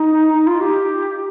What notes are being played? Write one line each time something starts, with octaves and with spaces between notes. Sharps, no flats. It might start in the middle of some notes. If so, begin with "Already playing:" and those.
Already playing: D#4
D#4
F4
G4